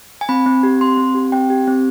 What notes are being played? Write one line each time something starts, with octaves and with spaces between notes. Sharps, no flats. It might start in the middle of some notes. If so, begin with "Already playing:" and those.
G#5
C4 B5
C4
G4
C4 C6
C4
G4
C4 G5
G4
C4